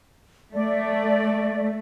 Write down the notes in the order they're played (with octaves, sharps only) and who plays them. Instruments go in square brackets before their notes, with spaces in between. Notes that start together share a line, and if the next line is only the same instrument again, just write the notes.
[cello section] A3 [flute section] D5